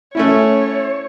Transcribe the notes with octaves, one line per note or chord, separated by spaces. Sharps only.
A3 C#4 E4 C#5